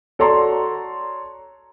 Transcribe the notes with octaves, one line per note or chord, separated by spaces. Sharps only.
F#4 A4 C#5 D5 A#5 C6